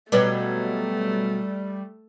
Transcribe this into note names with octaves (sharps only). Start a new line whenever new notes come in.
B2 F#3 G3 A3 G4 B4 D5